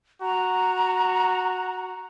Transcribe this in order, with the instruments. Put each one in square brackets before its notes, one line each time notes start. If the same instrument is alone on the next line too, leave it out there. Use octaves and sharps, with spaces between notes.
[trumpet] F#4 [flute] A#5